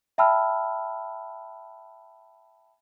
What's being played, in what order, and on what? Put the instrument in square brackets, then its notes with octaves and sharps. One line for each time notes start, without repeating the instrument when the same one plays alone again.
[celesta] E5 G5 A5 B5 E6 F6